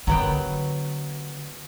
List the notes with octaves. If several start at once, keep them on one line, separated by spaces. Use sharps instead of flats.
D3 F#3 B3 G5